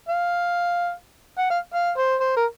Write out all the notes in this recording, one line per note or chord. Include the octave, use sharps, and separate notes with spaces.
F5
F#5
F5
F5
C5
C5
A#4